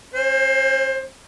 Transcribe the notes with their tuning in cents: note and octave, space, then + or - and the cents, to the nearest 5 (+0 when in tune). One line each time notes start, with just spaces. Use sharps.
C#4 -35 C5 +20